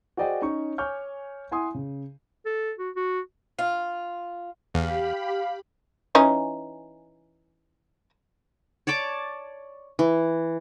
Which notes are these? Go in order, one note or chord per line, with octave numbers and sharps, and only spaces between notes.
F#4 G#4 C5 D5 D#5 G5
C#4 D#4 C#5 C#6
C#5 G#5 C#6 D6 F6 G6
E4 F#5 G#5 C6 D#6
C#3
A4
F#4
F#4
F4
E2 G4 F5 B5
E3 C#4 D#4
C#5 D5 A5 D6
E3